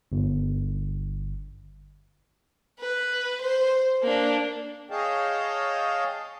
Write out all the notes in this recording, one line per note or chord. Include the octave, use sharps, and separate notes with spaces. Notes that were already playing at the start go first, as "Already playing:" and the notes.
G1
B4
C5
A#3 D4
G#4 C#5 D#5 F5 G5 A5